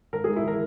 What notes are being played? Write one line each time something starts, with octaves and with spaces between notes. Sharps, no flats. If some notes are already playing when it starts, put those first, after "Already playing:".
G#1 A#4
G#4
G#2
E4
E3 A#4